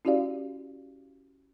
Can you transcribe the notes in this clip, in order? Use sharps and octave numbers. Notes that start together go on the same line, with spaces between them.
C#4 E4 F#4 G4 D5 F5